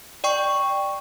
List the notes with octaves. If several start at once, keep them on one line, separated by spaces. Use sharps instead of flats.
D5 G5 C#6